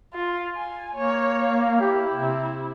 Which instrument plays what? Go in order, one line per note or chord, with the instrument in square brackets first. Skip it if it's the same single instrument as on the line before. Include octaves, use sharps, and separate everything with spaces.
[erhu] F4
G#5
[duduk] A#3 [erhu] C#5
[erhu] E4 [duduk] G4
[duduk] C3